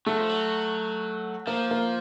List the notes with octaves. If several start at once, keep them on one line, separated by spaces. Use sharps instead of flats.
F#3 A3
F3
F#3
F3 A#3
A#3